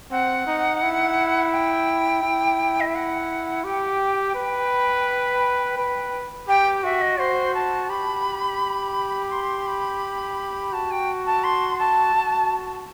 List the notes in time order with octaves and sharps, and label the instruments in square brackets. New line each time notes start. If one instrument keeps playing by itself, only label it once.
[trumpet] C4 [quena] F#5
[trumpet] D#4
E4
[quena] G5
[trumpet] E4
[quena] D#5
E5
F#5
[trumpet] G4 [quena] G5
[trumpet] B4
B4
[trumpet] G4 [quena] G5
[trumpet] F#4 [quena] E5
[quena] D#5
[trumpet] F#4 [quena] C5
[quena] A5
[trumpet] G4 [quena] B5
[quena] C6
B5
[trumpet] F#4 [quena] A5
[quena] G5
A5
C6
A5
[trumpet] F#4